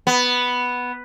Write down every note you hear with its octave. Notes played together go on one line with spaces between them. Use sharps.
B3